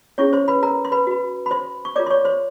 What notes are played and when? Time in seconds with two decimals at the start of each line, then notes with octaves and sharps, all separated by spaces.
0.18 C#4 E4 G#4 C#5 C#6
0.33 C5 C6
0.48 B4 B5
0.63 A#4 A#5
0.85 C6
0.92 B4 B5
1.07 F#4 B4
1.46 B5
1.51 C5 C6
1.85 C#6
1.96 F4 A#4 C#5 D5 D6
2.06 C6
2.10 C#5 C#6
2.25 C5 C6